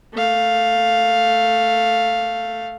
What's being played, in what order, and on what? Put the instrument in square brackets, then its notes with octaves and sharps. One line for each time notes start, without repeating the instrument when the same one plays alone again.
[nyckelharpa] A3 F5